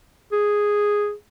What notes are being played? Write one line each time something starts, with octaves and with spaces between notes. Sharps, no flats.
G#4